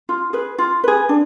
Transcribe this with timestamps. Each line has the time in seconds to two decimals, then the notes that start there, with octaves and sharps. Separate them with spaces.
0.09 F4
0.33 G#4 B4
0.58 F4
0.84 G#4 B4
1.09 D4